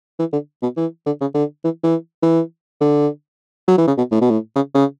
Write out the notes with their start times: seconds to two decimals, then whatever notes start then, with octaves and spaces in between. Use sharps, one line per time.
0.19 E3
0.33 D3
0.62 B2
0.77 E3
1.06 D3
1.21 C#3
1.35 D3
1.64 E3
1.84 E3
2.23 E3
2.81 D3
3.68 F#3
3.78 E3
3.88 C#3
3.98 B2
4.12 A2
4.21 B2
4.30 A2
4.56 C#3
4.75 C#3